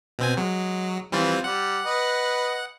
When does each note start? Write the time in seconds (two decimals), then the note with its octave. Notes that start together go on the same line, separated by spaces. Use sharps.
0.19 B2 C4 G#5
0.37 F#3 G#3
1.12 E3 F3 G3 C4 F4
1.44 G3 F#5
1.86 B4 D#5